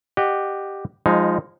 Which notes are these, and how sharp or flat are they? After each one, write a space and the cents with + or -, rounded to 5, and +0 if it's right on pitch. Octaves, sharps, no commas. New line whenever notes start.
G4 +0 D#5 -25 F#5 +0
F3 +0 G#3 -25 D#4 +0